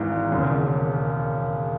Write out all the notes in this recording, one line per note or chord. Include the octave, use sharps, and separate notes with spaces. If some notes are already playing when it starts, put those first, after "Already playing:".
Already playing: G#1 G#2 E3
E1 D#2 C#3